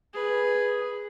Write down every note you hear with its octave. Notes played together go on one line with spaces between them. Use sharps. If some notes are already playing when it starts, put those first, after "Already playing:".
G#4 B4